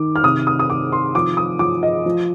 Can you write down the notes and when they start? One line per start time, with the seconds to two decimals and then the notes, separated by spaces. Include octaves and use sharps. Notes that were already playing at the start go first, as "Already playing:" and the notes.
Already playing: D#3 D6
0.16 F6
0.23 C3 D#6
0.47 D#6
0.59 D#6
0.69 D#3 D6
0.92 C6
1.15 F3 D6
1.37 D#6
1.59 F3 D6
1.83 D#5
2.06 F3